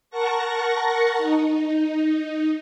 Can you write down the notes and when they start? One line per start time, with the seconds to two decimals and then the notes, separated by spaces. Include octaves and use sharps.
0.10 A#4 F#5 A5 C#6 A#6
1.18 D#4